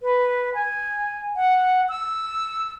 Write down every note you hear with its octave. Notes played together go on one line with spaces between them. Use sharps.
B4
G#5
F#5
E6